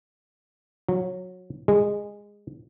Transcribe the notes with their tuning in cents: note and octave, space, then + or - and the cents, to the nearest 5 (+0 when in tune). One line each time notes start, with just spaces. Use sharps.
F#3 -20
G#3 -15